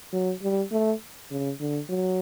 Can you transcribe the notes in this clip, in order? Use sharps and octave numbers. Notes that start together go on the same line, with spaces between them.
F#3
G3
A3
C#3
D3
F#3